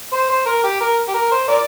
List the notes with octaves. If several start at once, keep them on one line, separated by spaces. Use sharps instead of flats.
C5
C5
A#4
G4
A#4
G4
A#4
C5
A#4 D5